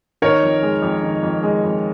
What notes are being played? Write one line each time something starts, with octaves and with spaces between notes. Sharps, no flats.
D#3 A#4 C#5
F2
G#3
F2
D#3
F2
G#3
F2